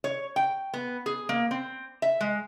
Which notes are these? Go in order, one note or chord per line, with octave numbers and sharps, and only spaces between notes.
C#5
G5
B3
G#4
A#3
C4
E5
G#3